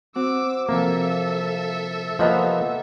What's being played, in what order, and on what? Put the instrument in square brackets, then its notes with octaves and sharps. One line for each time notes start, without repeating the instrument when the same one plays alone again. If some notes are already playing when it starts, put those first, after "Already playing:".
[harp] C4 F#4 [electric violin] D6 E6
[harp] C3 F3 [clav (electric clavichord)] A#3 [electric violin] A4 E5
[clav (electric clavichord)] F3 A#3 B3 [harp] G4 F#5 [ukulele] C5 D#5 A#5